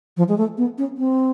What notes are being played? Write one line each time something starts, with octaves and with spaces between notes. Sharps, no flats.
F3
G#3
A3
B3
C#4
C4